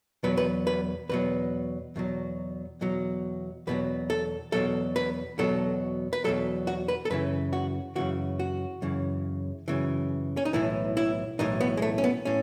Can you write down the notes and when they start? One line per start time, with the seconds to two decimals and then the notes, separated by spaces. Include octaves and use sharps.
0.23 E2 B2 F#3 B4
0.37 B4
0.67 B4
1.09 E2 B2 F#3 B4
1.96 E2 B2 F#3
2.81 E2 B2 F#3
3.67 E2 B2 F#3 B4
4.10 A4
4.52 E2 B2 F#3 A4
4.96 B4
5.38 E2 B2 F#3 A4
6.13 B4
6.24 E2 B2 F#3 A4
6.67 F#4
6.88 B4
7.05 A4
7.10 F#2 C#3 E3 B4
7.53 F#4
7.95 F#2 C#3 E3 F#4
8.39 F#4
8.82 F#2 C#3 E3
9.68 F#2 C#3 E3
10.37 C#4
10.45 D#4
10.53 B1 A2 E3 E4
10.97 E4
11.39 B1 A2 E3 D#4
11.60 B3
11.77 G#3
11.82 A3
11.98 C#4
12.04 B3
12.25 A2 C#4